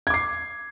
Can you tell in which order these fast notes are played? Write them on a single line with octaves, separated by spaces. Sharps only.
G#6 D6 C7